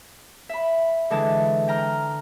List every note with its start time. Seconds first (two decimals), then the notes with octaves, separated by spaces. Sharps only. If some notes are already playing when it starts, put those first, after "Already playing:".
0.49 E5 B5
1.10 D3 E3 G#3 A5
1.68 G5 A#5 F6